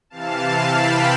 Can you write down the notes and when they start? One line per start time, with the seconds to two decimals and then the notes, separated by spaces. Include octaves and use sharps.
0.10 C3 E3 F5 A5
0.71 G5 B5